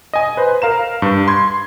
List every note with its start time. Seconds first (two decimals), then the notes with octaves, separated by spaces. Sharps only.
0.13 D#5 G#5
0.37 B4 C5
0.62 A#4 F5 A#5 E7
1.02 G2
1.27 B5 C6 G#6